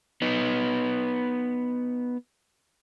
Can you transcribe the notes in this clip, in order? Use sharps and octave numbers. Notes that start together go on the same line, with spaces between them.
B3 D#4